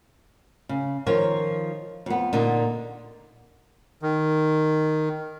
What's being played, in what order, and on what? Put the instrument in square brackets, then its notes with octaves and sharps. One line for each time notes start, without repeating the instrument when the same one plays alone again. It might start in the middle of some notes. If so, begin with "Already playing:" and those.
[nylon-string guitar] C#3
D#3 F3 A#4 C#5
F2 B3
A#2 D3 D#4
[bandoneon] D#3